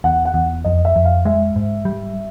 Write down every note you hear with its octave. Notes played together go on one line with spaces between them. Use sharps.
E2 F#5
F#5
E2
F2 D#5
E5
F2
F5
G#3 E5
G#2
G3